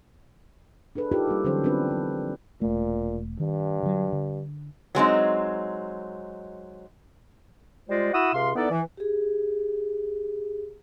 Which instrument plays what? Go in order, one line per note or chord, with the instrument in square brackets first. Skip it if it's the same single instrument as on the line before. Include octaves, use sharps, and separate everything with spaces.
[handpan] D4 G#4 A4 B4
D#4 F4 G4 A4 A#4
G3 A#3 E4
D3 E3 F#3 C#4 A4 C5
B3 C4 D4 F4 B4
F3
[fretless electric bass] E1 A3 [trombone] A#2
[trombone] G2 [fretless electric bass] D#3
[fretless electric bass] D3 F#3
D3
[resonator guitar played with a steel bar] F#3 G#3 C4 D#4
[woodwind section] G3 G#3 F4 C5 D5 D#5
E4 F#4 F#5 B5 D#6 E6
C#2 C3 F5 C6
E3 B3 D#4 A4 D5
E3
[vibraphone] G4 G#4